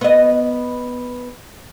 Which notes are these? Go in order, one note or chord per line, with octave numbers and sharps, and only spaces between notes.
B3 D#5